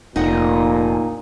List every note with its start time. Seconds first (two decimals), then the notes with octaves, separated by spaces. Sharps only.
0.16 F1 A#2 D#4 F#5